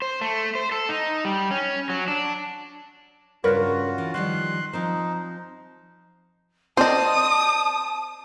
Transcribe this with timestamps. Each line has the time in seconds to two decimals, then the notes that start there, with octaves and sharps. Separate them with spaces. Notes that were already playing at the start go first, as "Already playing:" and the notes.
0.02 C5
0.21 A3
0.55 C5
0.72 A4
0.89 D#4
1.25 G3
1.51 C#4
1.90 F#3
2.08 D4
3.44 G2 C#3 F4 F#4 A#4 B4 C#5
3.98 E3
4.14 D#3 F3 G3 C6 F#6
4.73 F3 C4 D#4 C5
6.77 C4 C5 D5 D#5 A5 D#6